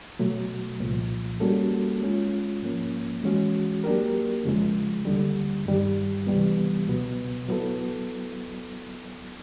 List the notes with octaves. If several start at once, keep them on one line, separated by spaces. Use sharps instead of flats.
B2 F#3 A3
C2 A#2 F3
G3 A#3 C#4 F#4 A4
G#3 C#4 F4
G#2 F3 A#3 C#4
E3 G#3 C#4 F#4
F#3 A#3 D4 G4 A#4
F2 C#3 F3 G#3
D#2 D3 G3
G2 D#3 G3
C#2 C3 E3 G3 B3
C#2 B2 F#3 B3
F#3 B3 E4 A4